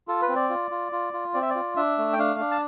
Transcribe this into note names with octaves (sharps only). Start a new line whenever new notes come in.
F4 A4
B4
C4
D5
F4
F4
F4
F4
C4 D5
E5
D5
F4
D4 E5
A3
G5
D4 F5
D4
A5